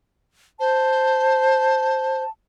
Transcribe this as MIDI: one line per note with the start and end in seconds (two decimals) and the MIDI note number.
0.59 2.22 72
0.59 2.29 81